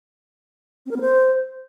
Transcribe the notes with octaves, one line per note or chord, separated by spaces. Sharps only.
C4
A#4
B3
C5